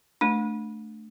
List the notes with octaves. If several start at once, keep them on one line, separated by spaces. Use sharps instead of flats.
A3 D4